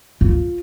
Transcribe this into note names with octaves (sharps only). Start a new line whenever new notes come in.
F4